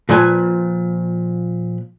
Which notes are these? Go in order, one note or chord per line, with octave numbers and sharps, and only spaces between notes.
A#2 F3 B4 G#5